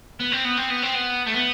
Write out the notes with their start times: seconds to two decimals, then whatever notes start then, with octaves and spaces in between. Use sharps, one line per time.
0.20 B3
0.32 C4
0.44 B3
0.57 C4
0.70 B3
0.82 C4
0.94 B3
1.26 A3
1.34 B3